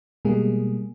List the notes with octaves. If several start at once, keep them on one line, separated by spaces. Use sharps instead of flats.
B2 G3 G#3 A#3 G#4